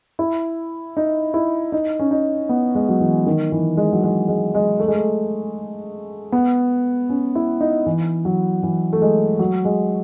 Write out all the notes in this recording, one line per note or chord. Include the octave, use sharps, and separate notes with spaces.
E4
D#4
E4
D#4
C#4
D#4
B3
G#3
F#3
E3
D#3
E3
G#3
F#3
G#3
G#3
G#3
A3
G#3
A3
B3
C#4
E4
D#4
E3
F#3
E3
A3
G#3
F#3
G#3